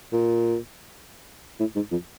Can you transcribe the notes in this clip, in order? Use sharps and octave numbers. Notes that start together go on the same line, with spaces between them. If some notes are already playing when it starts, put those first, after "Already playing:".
A#2
A2
G#2
F2